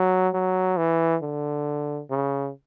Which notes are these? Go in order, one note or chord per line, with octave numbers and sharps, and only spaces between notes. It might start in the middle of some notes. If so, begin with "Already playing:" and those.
Already playing: F#3
F#3
E3
D3
C#3